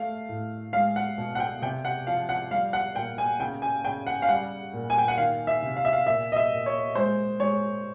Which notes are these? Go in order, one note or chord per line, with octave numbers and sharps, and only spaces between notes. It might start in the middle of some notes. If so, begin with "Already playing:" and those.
Already playing: A3 F5
A2
G#3 F5
F#5
B2
F#5
G5
C3 G5
F#5
F3 F5
F#5
G3 F5
F#5
A#2 G5
G#5
C#3 G5
G#5
C#3 G5
F#5
F5
G3 F#5
A#2
G#5
G5
F#5
D#3 F5
E5
C3
F5
E5
F5
A#2 E5
D#5
E5
A#2
C#5
G#3 C5
G#3 C#5